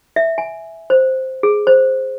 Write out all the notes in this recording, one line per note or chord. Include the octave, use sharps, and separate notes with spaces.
E5
G#5
C5
G#4
C5